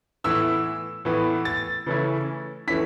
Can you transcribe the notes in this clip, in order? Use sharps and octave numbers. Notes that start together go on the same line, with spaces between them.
A2 E3 B3 E4 E6
A2 E3 B3 E4
A6
C#3 E3 A3 C#4 E4
E3 A3 C#4 E4 B6